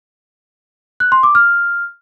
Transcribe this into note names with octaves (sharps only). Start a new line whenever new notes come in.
F#6
C6
D6
F6